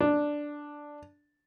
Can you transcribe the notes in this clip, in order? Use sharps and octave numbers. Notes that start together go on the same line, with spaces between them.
D4